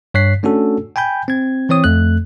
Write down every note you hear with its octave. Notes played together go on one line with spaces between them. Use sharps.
G2 C#5 F#6 B6 C7
A3 C#4 D4 F#4 A4
G5 G#5 B5 G6
C4 G#6
E3 C4 C#5 D#6
F2 A3 F#6